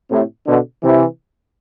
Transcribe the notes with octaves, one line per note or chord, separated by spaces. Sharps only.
A2 C3
B2 D3
C3 E3